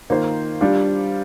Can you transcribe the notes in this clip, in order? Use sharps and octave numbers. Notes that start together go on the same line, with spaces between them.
D#3 A#3 F4 C5
G3 D4 F4